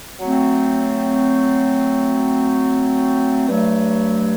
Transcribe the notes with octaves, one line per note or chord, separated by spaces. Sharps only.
F#3 A3 C4
G2 F#3 A3